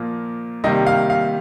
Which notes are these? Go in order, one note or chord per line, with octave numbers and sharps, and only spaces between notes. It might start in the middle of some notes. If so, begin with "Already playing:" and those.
Already playing: A#2 F3 A#3
C3 D#3 G3 A#3 D#5
F5
F5